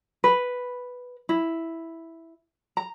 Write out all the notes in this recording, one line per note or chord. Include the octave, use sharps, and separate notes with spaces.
B4
E4
A#5